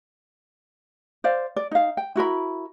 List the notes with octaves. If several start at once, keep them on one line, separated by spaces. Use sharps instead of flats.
C5 D5 F5
D5
D#4 F5
G5
E4 F#4 A#4 B5